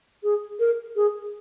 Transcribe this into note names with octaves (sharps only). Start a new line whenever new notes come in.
G#4
A#4
G#4